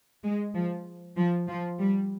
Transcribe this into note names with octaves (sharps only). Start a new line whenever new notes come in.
G#3
F3
F3
F3
G3